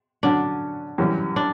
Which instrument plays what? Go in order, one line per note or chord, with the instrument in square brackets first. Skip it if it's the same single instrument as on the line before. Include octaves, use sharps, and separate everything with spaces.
[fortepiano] D3 F#3 C#4 [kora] D4
[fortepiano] F#2 E3 G3 C#4
[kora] D4